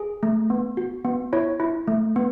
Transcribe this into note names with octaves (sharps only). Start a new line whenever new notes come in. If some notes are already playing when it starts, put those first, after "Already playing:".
Already playing: G#4
A3
B3
F#4
B3
E4 C#5
E4
A3
B3